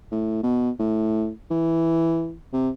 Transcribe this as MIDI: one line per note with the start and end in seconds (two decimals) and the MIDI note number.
0.12 0.41 45
0.43 0.71 47
0.79 1.30 45
1.51 2.34 52
2.53 2.69 48